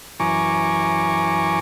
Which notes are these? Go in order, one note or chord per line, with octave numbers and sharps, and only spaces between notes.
F#2 E3 G#5 A#5 C#6 D6